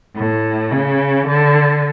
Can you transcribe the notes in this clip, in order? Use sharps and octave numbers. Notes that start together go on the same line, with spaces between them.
A2
C#3
D3